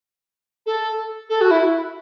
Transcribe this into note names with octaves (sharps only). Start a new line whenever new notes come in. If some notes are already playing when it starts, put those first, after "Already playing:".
A4
A4
F#4
E4